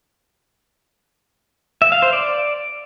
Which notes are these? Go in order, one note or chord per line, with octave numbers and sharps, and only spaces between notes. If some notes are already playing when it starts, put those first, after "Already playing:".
E5
F5
C5
D5